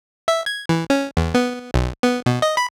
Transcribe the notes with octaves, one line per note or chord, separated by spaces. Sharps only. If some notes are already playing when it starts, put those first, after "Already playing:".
E5
G#6
E3
C#4
E2
B3
B1
B3
B2
D#5
B5